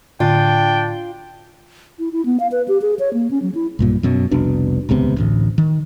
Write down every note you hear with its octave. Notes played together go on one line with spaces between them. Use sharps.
A2 D3 D4 F4 G5
E4
E4
B3
F5
B4
G4
G#4
C#5
A#3
C#4
F#3
E4
B1 G2 A#2
F#2 B2 F#3
F1 C2 B2 D4
D#1 C#2 C3 B3
A1 D2 A2
D#3